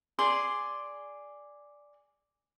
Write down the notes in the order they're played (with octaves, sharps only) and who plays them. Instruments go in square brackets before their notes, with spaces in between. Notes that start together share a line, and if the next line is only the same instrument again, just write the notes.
[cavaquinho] G#4 D5 C6